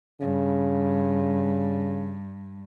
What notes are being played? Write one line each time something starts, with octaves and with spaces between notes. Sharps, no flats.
G2 C#3